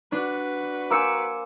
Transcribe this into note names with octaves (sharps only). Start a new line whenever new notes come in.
D4 F#4 B4
A#3 C5 G#5 D6 E6 C#7